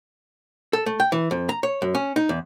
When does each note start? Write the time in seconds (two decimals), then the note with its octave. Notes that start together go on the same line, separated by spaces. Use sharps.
0.73 A4
0.86 A3
1.00 G5
1.12 E3
1.31 F2
1.49 A#5
1.63 C#5
1.82 F#2
1.95 C#4
2.16 D#4
2.29 E2